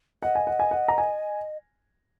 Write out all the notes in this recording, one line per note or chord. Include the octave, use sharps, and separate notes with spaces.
D#5 F#5
G#5
F#5
G#5
F#5
A#5
G#5